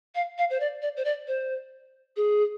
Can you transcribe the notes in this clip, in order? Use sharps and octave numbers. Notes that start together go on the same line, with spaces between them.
F5
F5
C5
D5
D5
C5
D5
C5
G#4